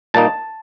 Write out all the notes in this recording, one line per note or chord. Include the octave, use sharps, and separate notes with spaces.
A#2 G3 A#3 D#4 A5